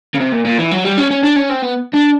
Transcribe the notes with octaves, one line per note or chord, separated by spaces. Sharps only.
C#3
C3
A#2
A#2
E3
F#3
G3
C#4
C#4
D4
C#4
C4
B3
D4